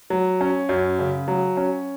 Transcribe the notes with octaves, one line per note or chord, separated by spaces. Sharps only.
F#3
C#4
F#2
C#3
F#3
C#4